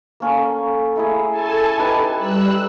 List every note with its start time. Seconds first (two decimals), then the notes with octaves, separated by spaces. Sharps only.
0.20 A#3 C#4 A4
0.96 A3 E4 G#4
1.29 A4 G#5 A5
1.78 D#4 G4 B4
2.17 G3 E6 F#6